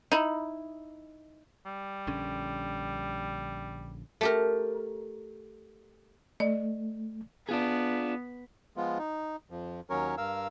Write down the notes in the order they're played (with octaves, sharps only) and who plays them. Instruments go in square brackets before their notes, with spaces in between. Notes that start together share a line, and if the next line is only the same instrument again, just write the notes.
[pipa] D#4 E4
[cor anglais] G3
[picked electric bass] A#1 D3 C#4
[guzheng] A3 G4 A#4
[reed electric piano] A3 [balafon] D5 D#5
[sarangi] B3 [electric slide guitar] D4 F4 G#4
[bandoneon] F3 G#3 B3 F4
D#4
F2 F3
D#2 F#3 C#4 A#4 C#5
G2 A#4 F5 E6